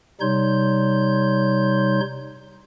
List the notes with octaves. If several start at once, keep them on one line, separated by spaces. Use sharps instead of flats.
C3 G3 D#4 C#5 C6 G6